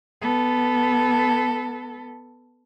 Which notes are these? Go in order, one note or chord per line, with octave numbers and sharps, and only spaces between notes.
B3 A4